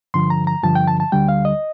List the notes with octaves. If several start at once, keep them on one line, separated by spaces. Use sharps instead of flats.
G2 D3 F3 C6
A#5
A#5
G2 D3 F3 A5
G5
A5
A5
D2 D3 G3 G5
F5
D#5